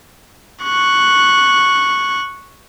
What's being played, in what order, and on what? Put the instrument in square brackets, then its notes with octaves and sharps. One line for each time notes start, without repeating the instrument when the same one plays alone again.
[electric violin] C#6 F#6